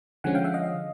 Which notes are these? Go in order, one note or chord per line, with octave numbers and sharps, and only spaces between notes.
D3 F3 G#3 C#4 F#5 G#5
F5 G5
E5 F#5
D#5 F5